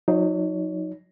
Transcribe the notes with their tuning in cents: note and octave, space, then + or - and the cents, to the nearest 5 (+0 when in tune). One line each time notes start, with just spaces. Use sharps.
F#3 -40 D#4 +10 C#5 +35